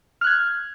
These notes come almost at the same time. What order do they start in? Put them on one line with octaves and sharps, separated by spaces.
F6 F#6 G#6